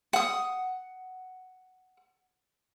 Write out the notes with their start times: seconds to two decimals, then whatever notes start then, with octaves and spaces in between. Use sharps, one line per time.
0.13 F#5 D#6